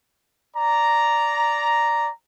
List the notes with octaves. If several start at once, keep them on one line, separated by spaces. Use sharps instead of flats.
D5 A#5